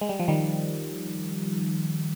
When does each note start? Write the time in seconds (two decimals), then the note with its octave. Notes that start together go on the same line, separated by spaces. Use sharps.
0.01 G#3
0.09 G3
0.19 F3
0.28 D#3 G3